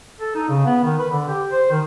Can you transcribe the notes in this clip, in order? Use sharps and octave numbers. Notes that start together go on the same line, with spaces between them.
A4
D#4
C#3
B3
D#3
B4
D3
G4
C5
D#3